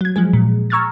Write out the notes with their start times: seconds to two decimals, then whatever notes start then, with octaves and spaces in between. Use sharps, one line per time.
0.01 F#3 G#6
0.16 F3 F#3 G#3 G#4
0.33 A#2
0.70 A#5 C#6 E6 F6 G#6 A6